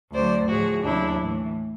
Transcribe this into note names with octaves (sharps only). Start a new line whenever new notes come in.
D2 D3 F#3 C5 D5
A2 F3 F#4 G#4
D#2 C#3 F#3 D4 E4
A2 E3